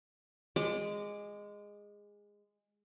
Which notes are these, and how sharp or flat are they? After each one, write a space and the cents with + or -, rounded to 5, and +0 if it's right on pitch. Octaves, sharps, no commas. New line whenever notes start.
G#3 -15 D6 +15